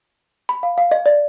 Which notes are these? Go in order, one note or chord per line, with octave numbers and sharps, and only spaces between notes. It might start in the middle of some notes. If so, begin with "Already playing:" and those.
B5
F5
F5
D#5
D5